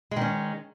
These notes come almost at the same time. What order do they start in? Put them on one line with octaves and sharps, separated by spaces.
G#3 D#3 C#4